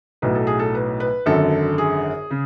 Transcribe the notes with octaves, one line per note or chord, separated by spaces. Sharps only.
B1 A2 F#3 B4
A4
G#4
A4
B4
B4
G#1 F#2 D3 A4
G#4
C#3